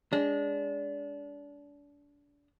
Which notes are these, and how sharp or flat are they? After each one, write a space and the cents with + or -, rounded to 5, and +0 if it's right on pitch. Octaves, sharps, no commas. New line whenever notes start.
G#3 -15 D4 -30